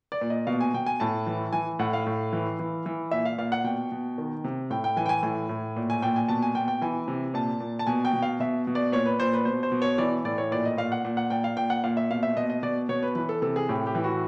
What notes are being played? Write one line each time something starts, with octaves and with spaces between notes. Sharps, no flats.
D5
A#2
D#5
B2 F5
G#5
B2 G5
G#5
A2 A5
E3
E3 G#5
A2 F#5
F5
A2
E3
E3
E3
A#2 E5
F5
A#2 F5
F#5
B2 G5
B2
D#3
C3
A2 G5
G5
E3 G#5
G5
G#5
A2 G#5
A2
A#2
G#5
A#2 G5
G#5
B2 A5
G#5
B2 G5
G5
E3 G#5
C3
A#2 A5
A#2
A5
B2 G#5
G5
B2
F5
B2 E5
B2
D5
A#2 C#5
B4
A#2 C5
B4
B2 C5
C5
B2
C#5
E3 D5
A2 D5
C#5
A#2 D5
D#5
A#2 F5
F#5
A#2
F#5
A#2 G5
F5
A#2 G5
F#5
A#2 F5
E5
B2 F5
E5
B2 D#5
D#5
B2 D5
B2 C#5
B4
E3 B4
A4
C3 A4
G#4
A2 G4
G4
E3
F#4